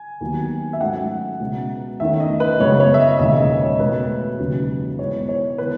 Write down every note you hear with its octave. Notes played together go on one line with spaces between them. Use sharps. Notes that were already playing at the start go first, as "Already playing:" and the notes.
Already playing: G#5
D#2 D#3 F#3 B3
E5
G#2 F#3 A3 C#4 F#5
C#2 B2 G#3 C#4
E2 D#3 A3 C#4 E5
D#5
B4
F#2 C#3 G#3 B3 C#5
C#5
E5
D#5
E1 D#2 C#3 G#3 E5
D#5
C#5
C#2 B2 A3 B4
E1 D#2 C#3 F#3 C#4
G#2 E3 G#3 B3 C#5
C#5
E3 B3 B4